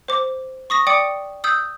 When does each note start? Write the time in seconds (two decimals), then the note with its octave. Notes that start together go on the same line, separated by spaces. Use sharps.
0.08 C5 D6
0.70 C#6 D#6 A#6
0.87 D5 G5 D6 D#6 C#7
1.44 D#6 E6 G6